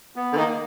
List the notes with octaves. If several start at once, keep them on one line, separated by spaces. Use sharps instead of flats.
B3
D3
D#3 A#3